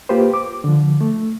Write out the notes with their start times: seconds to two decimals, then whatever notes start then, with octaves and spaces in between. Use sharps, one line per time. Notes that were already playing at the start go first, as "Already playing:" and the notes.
0.09 A#3 F4 G4 B4 C5
0.34 D6
0.64 D3 F3
1.01 A3